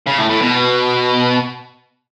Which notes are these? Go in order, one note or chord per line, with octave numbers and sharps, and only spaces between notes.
C#3
A2
A2
B2